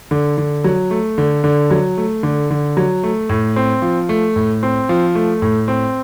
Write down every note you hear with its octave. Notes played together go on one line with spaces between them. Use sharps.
D3
D3
F#3
A3
D3
D3
F#3
A3
D3
D3
F#3
A3
A2
C4
F3
A3
A2
C4
F3
A3
A2
C4